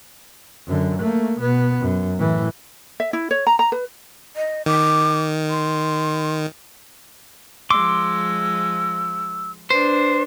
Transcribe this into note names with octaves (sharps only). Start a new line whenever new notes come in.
F#2 D3
A3 A#3
B2 B3
F#2
A2 E3
E5
E4
C#5
A#5
A#5
B4
D#5
D#3 D6
C6
F3 G#3 C6 D6 E6
D4 B4 C5